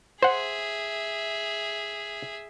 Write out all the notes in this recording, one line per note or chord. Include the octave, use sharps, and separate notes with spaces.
G#4 C5 E5 F#5